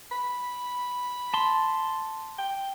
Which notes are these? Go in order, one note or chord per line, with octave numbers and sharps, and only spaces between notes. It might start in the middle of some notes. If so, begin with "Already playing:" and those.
B5
A5 C6
G5